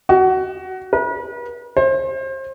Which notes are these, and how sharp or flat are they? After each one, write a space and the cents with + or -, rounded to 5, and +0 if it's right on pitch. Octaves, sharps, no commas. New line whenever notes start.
F#4 +20
B4 -40
C5 +30